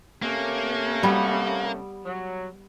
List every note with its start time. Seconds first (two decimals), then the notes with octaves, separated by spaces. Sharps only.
0.22 C3 A3 A#3 C#4
1.03 G3 B3
2.05 F#3